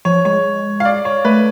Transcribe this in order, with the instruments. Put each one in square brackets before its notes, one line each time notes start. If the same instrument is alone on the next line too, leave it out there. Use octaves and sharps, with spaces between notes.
[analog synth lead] F3 [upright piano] C#5
[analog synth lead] G#3 [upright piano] C#5
[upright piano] F5
D5
C#5
[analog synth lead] A3 [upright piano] B4